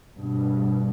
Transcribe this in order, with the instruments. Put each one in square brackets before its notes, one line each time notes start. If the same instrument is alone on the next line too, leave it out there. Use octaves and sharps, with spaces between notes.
[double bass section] G2 B2